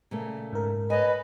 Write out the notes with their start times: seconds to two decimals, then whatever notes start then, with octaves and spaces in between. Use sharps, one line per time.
0.11 A#2 C#3 A3
0.53 G#2 A#4
0.90 B4 C#5 D#5 G#5